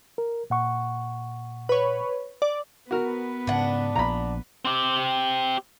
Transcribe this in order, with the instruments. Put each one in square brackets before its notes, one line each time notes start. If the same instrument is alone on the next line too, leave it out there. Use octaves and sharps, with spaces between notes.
[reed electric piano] A#4
A#2 F#5 C#6
[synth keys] B4 C#5
D5
[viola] B3 B4 [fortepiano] F#4 A#4
[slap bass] G#2 C#3 [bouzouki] D4 F#5
[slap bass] A#1 A#2 [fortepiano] A#5 B5
[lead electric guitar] C4 G4